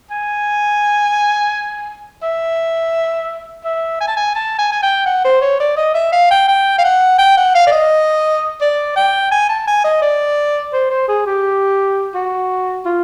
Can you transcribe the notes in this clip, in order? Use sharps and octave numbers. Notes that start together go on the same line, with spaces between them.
G#5
E5
E5
G#5
A5
G#5
A5
G#5
G#5
G5
F#5
C5
C#5
D5
D#5
E5
F5
G5
G5
F5
F#5
G5
F#5
F5
D5
D#5
D5
G5
G#5
A5
G#5
D#5
D5
C5
C5
G#4
G4
F#4
F4